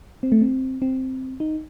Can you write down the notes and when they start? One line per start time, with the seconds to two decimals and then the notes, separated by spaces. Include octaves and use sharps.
0.23 C4
0.32 A3
0.41 C4
0.82 C4
1.40 D#4